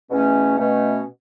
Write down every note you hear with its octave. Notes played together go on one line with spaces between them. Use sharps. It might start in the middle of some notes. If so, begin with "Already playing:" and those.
E2 B2 A3 C#4
B2 A3 C#4